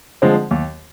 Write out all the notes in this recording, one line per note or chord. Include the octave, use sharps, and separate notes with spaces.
D3 F3 G#3 C4
D#2